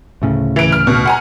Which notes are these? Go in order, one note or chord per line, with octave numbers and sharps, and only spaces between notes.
D2 A2 C#3
E3 D7
F6
B2
F#5 G#5 A#5